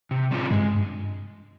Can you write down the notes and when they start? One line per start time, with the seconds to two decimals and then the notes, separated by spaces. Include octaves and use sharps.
0.11 C3
0.31 G3 C4 F4
0.50 G2 G#3